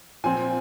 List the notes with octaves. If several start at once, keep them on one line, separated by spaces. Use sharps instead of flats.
A#2 F3 C4 G#5